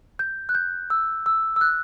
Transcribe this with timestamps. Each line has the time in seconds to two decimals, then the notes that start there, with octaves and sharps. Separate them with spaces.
0.19 G6
0.49 F#6
0.55 G6
0.90 E6
1.26 E6
1.56 E6
1.61 F#6